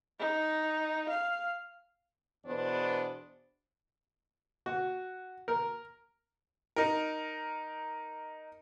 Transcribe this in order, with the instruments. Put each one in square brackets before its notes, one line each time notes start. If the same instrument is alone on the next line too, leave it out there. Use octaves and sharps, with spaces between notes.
[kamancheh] D#4
F5
[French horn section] E2 B2 B3 D4 C5
[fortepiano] F#4
A#4
[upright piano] D#4 A#4